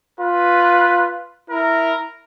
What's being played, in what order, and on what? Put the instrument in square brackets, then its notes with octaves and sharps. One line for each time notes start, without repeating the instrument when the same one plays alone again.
[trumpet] F4 [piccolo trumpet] B4
[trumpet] E4 [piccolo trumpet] A#4